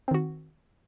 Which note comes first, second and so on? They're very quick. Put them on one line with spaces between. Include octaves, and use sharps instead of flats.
C4 D#3 F#4